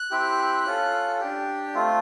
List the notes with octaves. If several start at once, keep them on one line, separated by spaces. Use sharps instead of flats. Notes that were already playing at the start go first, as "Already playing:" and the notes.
Already playing: F#6
C4 E4 G4
C#4 F4 A4
D4 G4
A3 C4 F4